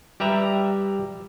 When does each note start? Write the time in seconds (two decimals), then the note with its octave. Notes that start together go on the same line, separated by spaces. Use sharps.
0.20 G3 G4 B4 E5 A#5